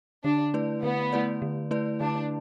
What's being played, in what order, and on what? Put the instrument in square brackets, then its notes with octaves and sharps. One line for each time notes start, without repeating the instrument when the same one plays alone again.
[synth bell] D3 [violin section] D4
[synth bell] A3 E4 B4 D5
[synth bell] D3 [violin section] B3
[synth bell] A3 E4 B4 D5
D3
A3 E4 B4 D5
[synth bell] D3 [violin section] D4